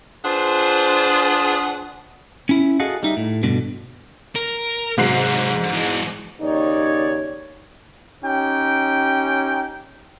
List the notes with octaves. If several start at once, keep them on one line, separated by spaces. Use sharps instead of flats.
D4 F4 G#4 B4 C5 F#5
C#4 E4
F#4 G#4 A4 D#5 F5 F#5
G3 D#4 E5
A2
G2 B2 D3
A#4
G#2 C3 F#3 F#4 C7
E3 G#3
D#2 C#3 D#4 C#5 D5
C#4 D#4 G4 G5